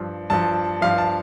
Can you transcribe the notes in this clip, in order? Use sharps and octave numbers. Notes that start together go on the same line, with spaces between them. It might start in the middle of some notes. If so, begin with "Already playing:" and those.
Already playing: G2 F3
G2 F3 A5
G2 F3 F5
A5